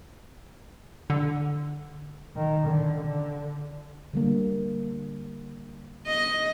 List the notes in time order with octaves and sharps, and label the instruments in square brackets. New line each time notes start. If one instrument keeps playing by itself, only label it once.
[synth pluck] D3
[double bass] D#3
D3
D3
[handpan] D3 G3 A#3
[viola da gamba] D#5